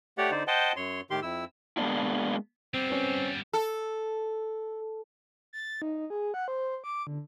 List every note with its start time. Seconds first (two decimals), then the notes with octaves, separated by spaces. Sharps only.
0.18 A3 G4 C#5 D5 F#5
0.31 D3 D#4 C5 D5
0.47 C5 D#5 F#5 G5 A5
0.76 F#2 C#5 C6
1.10 A2 D#3 G4 C6
1.22 F2 E4 E6
1.77 G#3 A#3 B3 C#4 D4 E4
2.74 G3 B3 C4
2.90 C#4 B4
3.53 A4
5.53 A6
5.82 D#4
6.10 G#4
6.34 F#5
6.48 C5
6.84 D6
7.07 D3